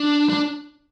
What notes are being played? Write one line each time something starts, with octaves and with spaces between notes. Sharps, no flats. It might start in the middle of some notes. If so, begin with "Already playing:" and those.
Already playing: D4
D4